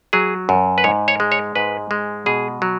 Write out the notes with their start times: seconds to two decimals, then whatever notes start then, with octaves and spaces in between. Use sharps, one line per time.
0.13 F#3 G#4
0.49 F#2
0.78 B4
0.84 G#2 C#5
1.08 C#5
1.20 G#3
1.32 C#5
1.56 G#2 B4
1.91 G#3
2.26 B2 G#4
2.62 F#3